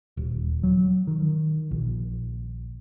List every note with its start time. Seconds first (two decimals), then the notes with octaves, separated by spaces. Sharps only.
0.17 D#1
0.63 F#3
1.07 D#3
1.71 A#1